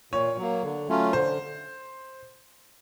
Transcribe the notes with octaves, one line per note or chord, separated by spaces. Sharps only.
A#2 C#5
F#3 A#3
D3
F#3 A3 C#4 F4
D3 C5